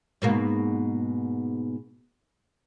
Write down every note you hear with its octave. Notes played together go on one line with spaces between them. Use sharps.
G#2 B2 A#3